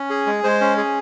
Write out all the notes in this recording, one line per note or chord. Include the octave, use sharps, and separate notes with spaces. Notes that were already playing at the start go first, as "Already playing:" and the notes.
Already playing: C#4
G#4
G#3
G#3 C5
C#4
G#4